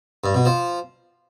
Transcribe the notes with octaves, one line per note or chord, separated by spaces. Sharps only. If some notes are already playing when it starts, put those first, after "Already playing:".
G2
B2
F3